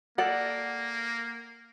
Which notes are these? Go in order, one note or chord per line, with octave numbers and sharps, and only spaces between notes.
A#3 A4 D5 F#5